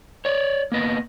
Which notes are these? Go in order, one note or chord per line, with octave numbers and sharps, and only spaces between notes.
C#5 D5
A#3 B3 D#5